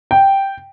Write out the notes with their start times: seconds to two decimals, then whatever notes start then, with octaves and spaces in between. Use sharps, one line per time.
0.11 G5